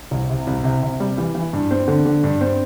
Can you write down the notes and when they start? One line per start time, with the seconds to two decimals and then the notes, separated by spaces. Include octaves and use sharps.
0.11 C2
0.30 C3
0.47 C2
0.64 C3
0.83 C3
1.00 G3
1.18 E3
1.35 E3
1.53 G2
1.71 C4
1.88 D3
2.06 D3
2.24 G2
2.41 C4